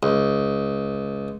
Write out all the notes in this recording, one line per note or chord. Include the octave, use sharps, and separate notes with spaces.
C#2